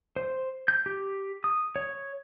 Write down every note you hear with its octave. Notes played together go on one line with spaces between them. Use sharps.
C5
G6
G4
D#6
C#5